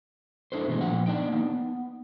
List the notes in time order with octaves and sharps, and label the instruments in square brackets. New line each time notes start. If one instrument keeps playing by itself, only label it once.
[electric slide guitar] D4 E4 A4 C5
B2 E3 G#3 A3
A#2 F3 F#5
B3 D4 D#4 G5
A#3 D#4
B3